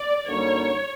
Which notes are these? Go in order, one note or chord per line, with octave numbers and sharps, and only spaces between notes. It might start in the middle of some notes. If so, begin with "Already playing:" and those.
Already playing: D5
F#2 D3 G3 A#3 D#4 C#5